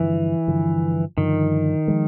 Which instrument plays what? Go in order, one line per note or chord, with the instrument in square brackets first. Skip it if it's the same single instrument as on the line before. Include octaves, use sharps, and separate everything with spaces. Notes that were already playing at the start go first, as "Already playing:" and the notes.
Already playing: [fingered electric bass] G2 D3 F3 [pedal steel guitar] E3
[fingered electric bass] G2 D3 F3
[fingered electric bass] G2 D3 F3 [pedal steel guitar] D#3
[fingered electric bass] F3 G#3